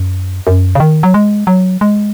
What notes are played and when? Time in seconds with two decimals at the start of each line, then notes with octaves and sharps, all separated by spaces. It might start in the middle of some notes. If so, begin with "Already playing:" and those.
Already playing: F#2
0.47 F#2
0.75 C#3
0.80 D#3
1.03 F#3
1.14 G#3
1.47 F#3
1.81 G#3